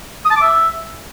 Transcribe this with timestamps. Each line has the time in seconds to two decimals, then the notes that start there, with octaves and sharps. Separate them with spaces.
0.25 D#6
0.30 A5
0.36 D6
0.42 E5